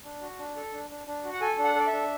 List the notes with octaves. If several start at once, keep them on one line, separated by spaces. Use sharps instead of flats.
D4
F#4
D4
A4
D4
D4
D4
F#4
F#5
A4 G#5
D4
F#5
A4 D5
E5
D4